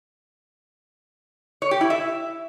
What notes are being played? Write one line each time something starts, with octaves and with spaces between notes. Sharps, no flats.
C#5
G4
E4
E5